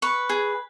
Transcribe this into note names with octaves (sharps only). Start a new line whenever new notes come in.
B4 C#6
G#4